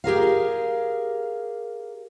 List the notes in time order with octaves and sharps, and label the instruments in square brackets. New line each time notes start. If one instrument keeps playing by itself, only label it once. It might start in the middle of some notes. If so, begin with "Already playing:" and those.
[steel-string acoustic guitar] G4 G#4 A#4 F5